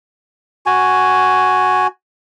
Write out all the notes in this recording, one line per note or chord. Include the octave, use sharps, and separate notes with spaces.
F#4 G#5